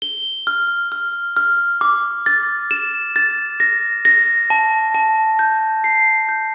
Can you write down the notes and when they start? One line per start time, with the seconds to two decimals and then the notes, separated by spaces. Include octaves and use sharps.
0.02 G7
0.47 F6
0.92 F6
1.37 F6
1.81 D6
2.26 A6
2.71 E7
3.16 A6
3.60 A#6
4.05 A#6
4.50 A5
4.94 A5
5.39 G6
5.84 C7
6.29 G6